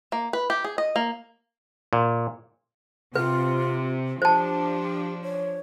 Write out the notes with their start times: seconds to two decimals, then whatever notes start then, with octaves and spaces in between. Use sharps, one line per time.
0.12 A#3
0.33 B4
0.50 G4
0.64 G#4
0.78 D#5
0.96 A#3
1.93 A#2
3.15 C3 F4 B4
4.22 F3 D4 G4 C5 A5
5.22 C#5